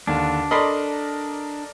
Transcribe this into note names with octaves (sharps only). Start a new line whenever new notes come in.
D#2 D3 D4
A4 A#4 D5 D#5 B5 C6